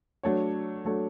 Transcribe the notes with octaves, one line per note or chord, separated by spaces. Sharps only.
F#3 A3 D4 A4 C#5
F#3 A3 D4 A4 C#5